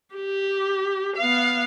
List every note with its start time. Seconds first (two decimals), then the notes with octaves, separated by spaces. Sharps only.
0.16 G4
1.17 B3 F5